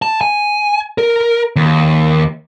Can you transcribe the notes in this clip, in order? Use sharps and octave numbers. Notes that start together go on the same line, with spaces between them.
A5
G#5
A#4
D#2